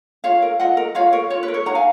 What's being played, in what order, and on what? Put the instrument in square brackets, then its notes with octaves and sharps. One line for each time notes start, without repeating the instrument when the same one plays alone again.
[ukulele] F4 C#5 F5
A#4
F4 D#5 F#5
A#4
F4 C#5 F5
A#4 C#5
F4 C#5
B4
A#4
C#5
D#4 F#5 A#5
F5 G#5